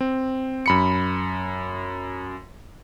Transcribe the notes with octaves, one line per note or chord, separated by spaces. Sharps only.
C4
F#2 B5 C#7